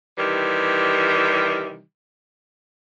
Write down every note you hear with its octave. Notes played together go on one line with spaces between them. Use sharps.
C3 D#3 E3 G3